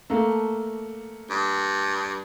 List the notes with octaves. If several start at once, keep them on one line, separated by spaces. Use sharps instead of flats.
A3 A#3
G2